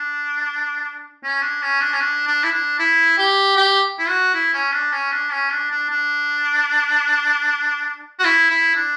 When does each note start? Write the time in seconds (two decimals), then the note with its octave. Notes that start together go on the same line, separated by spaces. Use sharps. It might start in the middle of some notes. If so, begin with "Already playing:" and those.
Already playing: D4
1.23 C#4
1.42 D4
1.62 C#4
1.81 D4
1.93 C#4
2.00 D4
2.27 D4
2.44 E4
2.52 D4
2.79 E4
3.18 G4
3.56 G4
3.99 E4
4.09 F#4
4.35 E4
4.54 C#4
4.73 D4
4.92 C#4
5.12 D4
5.32 C#4
5.52 D4
5.71 D4
5.90 D4
8.20 F#4
8.24 E4
8.50 E4
8.75 D4